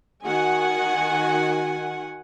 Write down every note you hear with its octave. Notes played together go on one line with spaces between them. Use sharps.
D#3 F#4 F#5 G#5